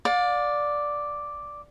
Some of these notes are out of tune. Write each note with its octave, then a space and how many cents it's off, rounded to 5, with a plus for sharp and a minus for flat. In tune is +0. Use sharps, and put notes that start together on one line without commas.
D5 +0 F5 +40